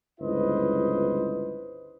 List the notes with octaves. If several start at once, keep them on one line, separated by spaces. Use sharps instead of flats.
G1 C#2 E4 B4 C5 D#5